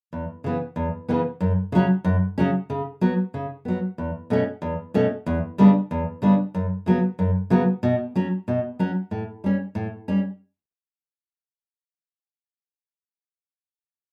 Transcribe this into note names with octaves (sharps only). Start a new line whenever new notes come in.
E2
C#3 E3 B3
E2
C#3 E3 B3
F#2
C#3 F#3 C#4
F#2
C#3 F#3 C#4
C#3
F#3 B3
C#3
F#3 B3
E2
B2 A3 C#4
E2
B2 A3 C#4
E2
C#3 G3 B3 D4
E2
C#3 G3 B3 D4
F#2
C#3 F#3 B3
F#2
C#3 F#3 B3
B2
F#3 C#4
B2
F#3 C#4
A2
G3 C#4
A2
G3 C#4